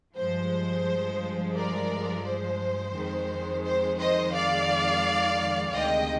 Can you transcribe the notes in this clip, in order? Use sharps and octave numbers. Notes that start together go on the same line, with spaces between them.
G2 F3 G#3 C5
A#4 D5
C5
F2 D#3 G#3
C5
C5 D#5
D5 F5
D2 C3 D#3 G#3 D#5 G5